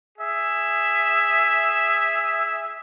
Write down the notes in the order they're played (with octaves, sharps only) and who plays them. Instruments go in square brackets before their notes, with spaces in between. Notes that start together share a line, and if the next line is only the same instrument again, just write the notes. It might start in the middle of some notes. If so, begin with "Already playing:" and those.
[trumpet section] G#4 E5